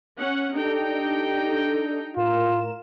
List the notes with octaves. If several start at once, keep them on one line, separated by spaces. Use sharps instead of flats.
C#4 F#5
D4 D#4 G4 A4 G5
A2 F4 A#4 E7